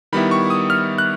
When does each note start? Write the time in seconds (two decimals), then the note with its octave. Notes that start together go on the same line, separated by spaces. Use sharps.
0.12 D#3 G3 B3 E4 B5
0.31 C#6
0.50 D#6
0.70 F6
0.98 F#6